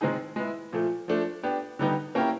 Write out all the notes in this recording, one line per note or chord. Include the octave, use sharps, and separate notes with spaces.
D#3 G#3 C4 D#4 G#4
G#3 B3 E4
A#2 F3 A3
F3 A3 D4
B3 D4 G4
D3 G3 B3 D#4 G4
A#3 C#4 E4 G4 A#4